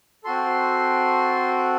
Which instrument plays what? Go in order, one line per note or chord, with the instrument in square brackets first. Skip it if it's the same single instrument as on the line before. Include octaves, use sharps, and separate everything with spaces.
[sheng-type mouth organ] C4 F#4 A4 C6